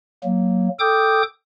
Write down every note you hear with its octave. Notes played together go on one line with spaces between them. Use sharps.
F#3 A#3
A4 G5 D6 D#6 G6